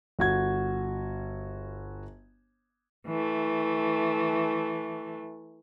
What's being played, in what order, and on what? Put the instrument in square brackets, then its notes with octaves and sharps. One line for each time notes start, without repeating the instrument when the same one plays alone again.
[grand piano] G1 F#4 G#6
[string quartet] E3 A3